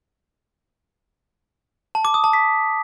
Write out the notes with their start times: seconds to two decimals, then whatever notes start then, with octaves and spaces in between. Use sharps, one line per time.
1.95 A5
2.05 D6
2.14 D#6
2.24 A5
2.33 B6